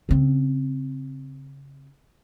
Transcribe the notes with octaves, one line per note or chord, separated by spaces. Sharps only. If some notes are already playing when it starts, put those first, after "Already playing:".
C#3 C4